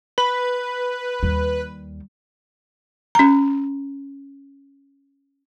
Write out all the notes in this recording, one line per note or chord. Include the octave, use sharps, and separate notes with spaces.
B4 B5
D#2 G3
C#4 A#5